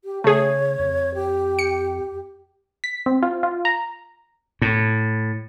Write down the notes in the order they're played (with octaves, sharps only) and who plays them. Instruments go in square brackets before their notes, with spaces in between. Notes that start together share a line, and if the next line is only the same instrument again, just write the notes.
[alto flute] G4
[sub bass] C#3 [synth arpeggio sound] A3 G#4 [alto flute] C#5
[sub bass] F2
[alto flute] G4
[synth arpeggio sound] C#7
[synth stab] B6
C4
F4
F4
A#5
[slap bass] A2